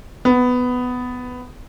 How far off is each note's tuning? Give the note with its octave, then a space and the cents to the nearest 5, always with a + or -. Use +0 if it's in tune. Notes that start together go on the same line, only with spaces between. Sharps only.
B3 +10